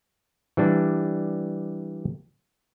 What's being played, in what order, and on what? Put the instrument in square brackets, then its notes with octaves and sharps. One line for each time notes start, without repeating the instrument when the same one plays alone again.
[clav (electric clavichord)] E3 G3 D4